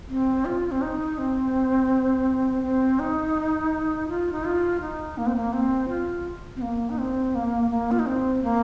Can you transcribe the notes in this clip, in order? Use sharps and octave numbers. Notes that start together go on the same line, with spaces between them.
C4
F4
C4
D#4
C4
C4
D#4
F4
D#4
F4
D#4
A#3
C4
A#3
C4
F4
C4
A#3
D#4
C4
A#3
A#3
F4
D#4
C4
A#3